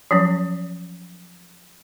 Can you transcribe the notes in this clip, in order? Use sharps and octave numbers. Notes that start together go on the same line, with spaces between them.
F3 F#3 C#4